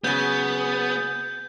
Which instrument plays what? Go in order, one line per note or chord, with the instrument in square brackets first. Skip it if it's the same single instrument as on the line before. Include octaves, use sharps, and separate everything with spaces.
[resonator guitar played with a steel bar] C#3 F#3 [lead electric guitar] B3 [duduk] G#4 [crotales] G6